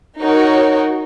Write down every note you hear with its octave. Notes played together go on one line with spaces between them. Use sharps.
D#4 F#4 A#4 C#5